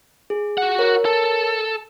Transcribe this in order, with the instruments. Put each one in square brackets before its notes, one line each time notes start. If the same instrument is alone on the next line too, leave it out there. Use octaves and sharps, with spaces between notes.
[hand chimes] G#4
[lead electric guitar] F#4 F#5
[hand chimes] A#4 C#5
[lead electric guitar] A4